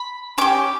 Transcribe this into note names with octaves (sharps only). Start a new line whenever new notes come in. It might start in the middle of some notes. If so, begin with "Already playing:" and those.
Already playing: B5
C#4 G4 D6